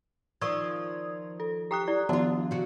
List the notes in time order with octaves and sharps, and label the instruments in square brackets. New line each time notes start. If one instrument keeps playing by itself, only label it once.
[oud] D#3 F3 [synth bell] D5 D#6 G#6 [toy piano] C#6 E6
[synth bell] A4
[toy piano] G4 G5 [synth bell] A#5 D#6 F#6
[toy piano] E4 G4 D5
[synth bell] D#3 F3 B3 [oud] D4 F4 [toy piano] A5
[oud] C3 F#4